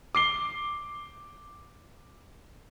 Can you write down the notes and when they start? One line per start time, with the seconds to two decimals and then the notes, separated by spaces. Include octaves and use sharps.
0.15 D6 C7 G7